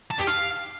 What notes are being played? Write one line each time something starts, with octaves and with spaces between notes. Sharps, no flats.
A5
G4
F5